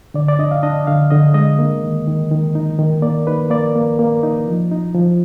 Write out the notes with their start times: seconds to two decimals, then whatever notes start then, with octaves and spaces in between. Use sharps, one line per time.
0.14 D3 D5
0.28 D5
0.39 D4 D#5
0.51 F5
0.63 D4 D#5
0.87 D3 F5
1.10 D3 D#5
1.34 G#3 D#5
1.59 A#3
1.84 D#3
2.07 D#3
2.31 D#3
2.55 D#4
2.79 D#3
3.02 A#3 D5
3.27 D#4 B4
3.50 A#3 D5
3.75 A#3
3.99 A#3
4.23 D#4
4.48 F3
4.71 D#4
4.95 F3